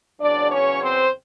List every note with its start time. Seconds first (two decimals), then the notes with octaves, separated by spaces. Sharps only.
0.19 E2 C#3 F#3 D4 D5
0.50 C#4 C#5
0.81 C4 C5